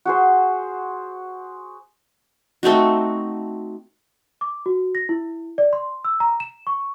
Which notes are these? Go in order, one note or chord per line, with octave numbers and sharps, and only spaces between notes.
F#4 G#4 C5
A3 C4 D#4 F#4
D6
F#4
A#6
E4
D5
C6
E6
A#5
E7
C#6